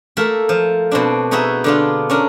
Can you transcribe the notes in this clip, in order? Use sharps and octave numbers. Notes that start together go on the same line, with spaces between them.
A3 A#3 A4 A#4 E5
F3
B2 C4 D4
B3 D#4 F#4 G#4 E5
D3 D4 F4
C#4 D4 A#4